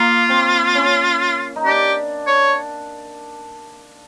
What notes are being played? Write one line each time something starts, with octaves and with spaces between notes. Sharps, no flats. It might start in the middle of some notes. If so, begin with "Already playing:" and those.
Already playing: A#3 F4
C4
C#4
D#4
D4 G4
C#5